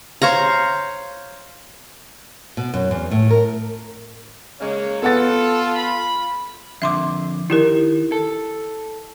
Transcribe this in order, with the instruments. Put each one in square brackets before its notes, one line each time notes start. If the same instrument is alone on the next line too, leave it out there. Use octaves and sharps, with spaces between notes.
[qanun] C5 C#5 F5 A#5
[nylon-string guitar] B2
F#2
E2
A2
A#4
[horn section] C#3 G#3 A#3 [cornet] C#5
[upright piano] B3 F#5 A6 [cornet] F4 [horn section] A4
[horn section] B5
[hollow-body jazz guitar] F2 D3 [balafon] E5 C6 D6
[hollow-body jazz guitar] D#3 [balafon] E4 G4 A#4
[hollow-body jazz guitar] A4